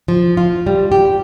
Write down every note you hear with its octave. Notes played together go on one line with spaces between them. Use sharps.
F3
F4
G3
G4